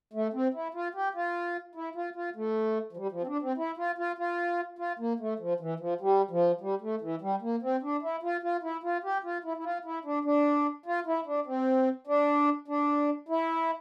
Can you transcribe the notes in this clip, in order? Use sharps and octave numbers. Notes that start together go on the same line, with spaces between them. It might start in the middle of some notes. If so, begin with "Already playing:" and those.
A3
C4
E4
F4
G4
F4
E4
F4
F4
A3
F3
G3
F3
C4
D4
C4
E4
F4
F4
F4
F4
A#3
A3
F3
E3
F3
G3
F3
G3
A3
E3
G3
A#3
C4
D4
E4
F4
F4
E4
F4
G4
F4
E4
E4
F4
E4
D4
D4
F4
E4
D4
C4
D4
D4
E4